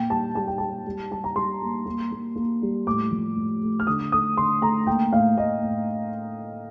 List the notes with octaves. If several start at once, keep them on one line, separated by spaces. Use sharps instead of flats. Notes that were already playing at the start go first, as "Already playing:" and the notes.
Already playing: A#2 G5
G3 A5
G3 A5
G5
G3 A5
G3
G3 A5
A#5
G3 C6
A#3
A#3
A#3
A#3
G3
A2 D6
F3
A2
A3
F6
D3 D#6
A3 D#6
D3 C6
A3 A#5
A#3 G5
A2 F5
A2 D#5
A2